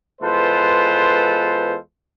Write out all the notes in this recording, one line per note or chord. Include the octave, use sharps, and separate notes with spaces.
E2 G#3 F4 A4 B4 C5